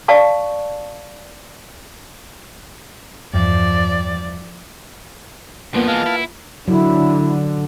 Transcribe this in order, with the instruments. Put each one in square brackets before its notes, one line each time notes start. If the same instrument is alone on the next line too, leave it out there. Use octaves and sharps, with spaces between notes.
[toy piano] D5 F5 A5 C#6
[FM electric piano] E2 G2 [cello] F3 D5
[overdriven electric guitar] G2 F3 [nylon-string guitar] A#3 B3 F4
[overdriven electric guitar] E3 G#3 [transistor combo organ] F5 A5
[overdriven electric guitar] E4
[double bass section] D3 [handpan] F#3 [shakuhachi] E4